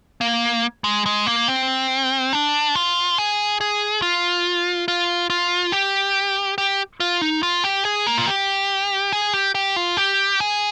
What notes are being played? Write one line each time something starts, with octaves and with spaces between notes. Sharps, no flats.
A#3
G#3
G#3
A#3
C4
D4
F4
G#4
G#4
F4
F4
F4
G4
G4
F4
D#4
F4
G4
G#4
A#3
F4
G4
G#4
G4
G4
F4
G4
G#4